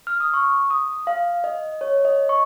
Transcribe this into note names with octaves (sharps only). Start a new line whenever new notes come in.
F6
D#6
C#6
D#6
F5
D#5
C#5
D#5
C#6